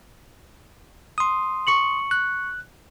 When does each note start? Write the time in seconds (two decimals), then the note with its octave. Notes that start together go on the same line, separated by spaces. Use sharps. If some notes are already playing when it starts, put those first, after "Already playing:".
1.18 C6 D#6
1.67 C#6 C#7 F#7
2.11 F#6